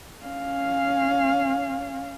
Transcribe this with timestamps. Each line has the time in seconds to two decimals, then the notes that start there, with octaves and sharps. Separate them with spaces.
0.24 C#4 F5